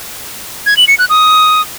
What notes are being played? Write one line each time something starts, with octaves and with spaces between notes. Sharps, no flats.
G#6
F#7
C#7
F#6
D#6